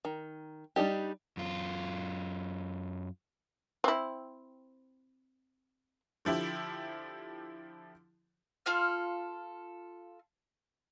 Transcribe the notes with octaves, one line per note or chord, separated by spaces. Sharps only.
D#3
G3 D4 D#4 G4
F#2 F4
C4 E4
D3 F3 E4 G4
F4 A4 F5 F6